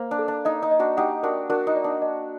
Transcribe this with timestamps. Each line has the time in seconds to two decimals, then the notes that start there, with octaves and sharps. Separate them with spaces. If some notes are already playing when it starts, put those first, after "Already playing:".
Already playing: A#3 C5
0.11 D4
0.19 A4
0.28 D4
0.45 D#4 D#5
0.62 D#4
0.71 D#5
0.79 D4 F#4
0.97 D#4 G4 F#5
1.23 D4 F#4 A#4
1.50 D4 F#4 A#4
1.67 D#4
1.76 D5
1.84 D4
2.02 D#5